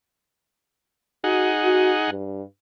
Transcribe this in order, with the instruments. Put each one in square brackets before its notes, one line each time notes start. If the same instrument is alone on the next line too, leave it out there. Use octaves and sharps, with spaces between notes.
[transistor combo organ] D#4 G#4 F#5 [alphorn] F#4
[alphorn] F#4
G2